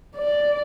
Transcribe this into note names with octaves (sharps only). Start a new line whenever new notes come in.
D5